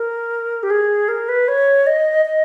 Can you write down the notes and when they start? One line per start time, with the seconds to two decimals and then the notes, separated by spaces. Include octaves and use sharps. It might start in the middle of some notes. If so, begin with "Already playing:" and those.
Already playing: A#4
0.63 G4
0.70 G#4
1.08 A#4
1.29 B4
1.48 C#5
1.87 D#5
2.25 D#5